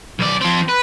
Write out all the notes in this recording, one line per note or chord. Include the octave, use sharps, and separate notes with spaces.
B1 D5
F3 C4
B4